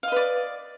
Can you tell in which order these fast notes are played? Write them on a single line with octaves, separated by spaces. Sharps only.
F5 D#5 B4 D5